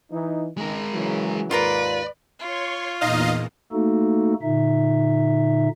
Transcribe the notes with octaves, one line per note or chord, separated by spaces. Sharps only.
E3 D#4
C#2 D#3 G#3 A#4
C#3 E3 F#3
D#2 G#2 F4 A#4 B4 D5 A#5
F4 C#5 C6 C#6
E2 A#2 D#4 D#5 F5
A3 A#3 D#4 F#4 A4
A#2 D3 D#4 E5